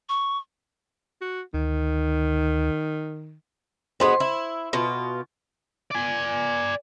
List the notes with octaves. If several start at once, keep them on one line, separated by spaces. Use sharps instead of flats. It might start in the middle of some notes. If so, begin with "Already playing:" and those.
C#6
F#4
D2 D#3
G#3 B3 F#4 C5 C6
E4
B2 F4
D5 G#5